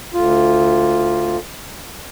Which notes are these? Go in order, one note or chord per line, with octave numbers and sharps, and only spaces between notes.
D2 F4